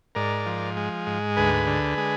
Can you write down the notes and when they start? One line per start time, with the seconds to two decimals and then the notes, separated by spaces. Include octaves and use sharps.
0.15 G#2 A#4 D5
0.46 F3
0.77 G#3
1.06 G#2
1.36 D2 G#4 B4
1.67 D3
1.97 G#3